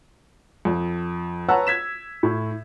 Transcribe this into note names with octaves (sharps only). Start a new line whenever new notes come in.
F2
B4 C#5 F#5 A5 A#5 E6
G#6 B6 E7
A2